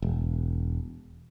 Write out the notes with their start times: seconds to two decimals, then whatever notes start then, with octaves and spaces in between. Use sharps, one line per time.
0.02 E1